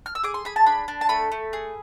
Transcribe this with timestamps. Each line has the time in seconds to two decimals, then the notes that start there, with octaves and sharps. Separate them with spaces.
0.06 F6
0.15 E6
0.23 G#4 D6
0.34 C6
0.45 G#4 B5
0.56 A5
0.66 D4 B5
0.88 D4
1.01 A5
1.09 A3 B5
1.32 A3
1.53 G#4